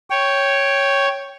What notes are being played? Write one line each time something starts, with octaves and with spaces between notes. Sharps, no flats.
C#5 G5